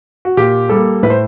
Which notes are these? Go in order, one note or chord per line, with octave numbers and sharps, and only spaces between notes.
F#4
A#2 G4
G3 A#3 A4
A2 B4
C5